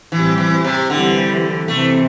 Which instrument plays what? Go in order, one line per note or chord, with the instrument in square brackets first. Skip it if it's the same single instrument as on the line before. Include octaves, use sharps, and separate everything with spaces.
[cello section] A2 G3 C4 G4 [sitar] E3
[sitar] E3
C3
[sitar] D3 [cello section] E3 G3 C4 G4
[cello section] C3 E3 C4 [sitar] A3